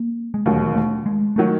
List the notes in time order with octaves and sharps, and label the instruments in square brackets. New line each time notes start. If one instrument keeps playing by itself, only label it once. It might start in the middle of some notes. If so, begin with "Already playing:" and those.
Already playing: [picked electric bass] A#3
G#3
[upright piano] E1 D#2 D#3 F#3 [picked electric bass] A3
[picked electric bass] A3
G#3
[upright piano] D#3 F#3 [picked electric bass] A3